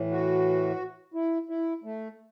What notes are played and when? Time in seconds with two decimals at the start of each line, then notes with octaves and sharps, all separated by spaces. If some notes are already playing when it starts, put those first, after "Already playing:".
Already playing: A2 E3
0.11 F#4
1.14 E4
1.49 E4
1.84 A3